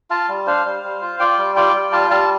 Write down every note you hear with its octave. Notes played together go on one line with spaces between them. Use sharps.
F4 F5 A5
G3
D4 C5 F5
G3
G3
F4
F4 D5 G5
G3
F4 D5 G5
G3
F4 F5 A5
G3 F5 A5